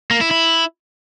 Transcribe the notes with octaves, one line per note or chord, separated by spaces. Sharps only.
A#3
E4
E4